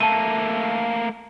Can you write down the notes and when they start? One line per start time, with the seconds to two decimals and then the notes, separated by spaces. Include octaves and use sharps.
0.01 A3 A#3 A5 D#7